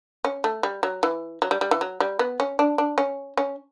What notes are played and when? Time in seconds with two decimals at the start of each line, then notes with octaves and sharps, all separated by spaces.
0.25 C#4
0.44 A3
0.63 G3
0.83 F#3
1.03 E3
1.42 F#3
1.51 G3
1.61 G3
1.71 E3
1.81 F#3
2.00 G3
2.19 B3
2.40 C#4
2.59 D4
2.78 D4
2.98 C#4
3.37 C#4